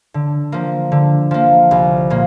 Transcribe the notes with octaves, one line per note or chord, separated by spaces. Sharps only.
D3
F3 A#3
D3
F3 A#3
C2
A#2 A#3